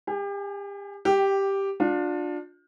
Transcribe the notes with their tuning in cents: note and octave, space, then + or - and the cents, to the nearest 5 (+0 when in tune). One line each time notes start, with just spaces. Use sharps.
G4 +35 G#5 +0
G4 +0 G5 -20
D4 +10 F4 +35